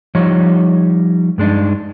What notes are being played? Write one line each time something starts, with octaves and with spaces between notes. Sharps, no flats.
F3 G3 D#4 C#5
G2 G#3 D4 D#4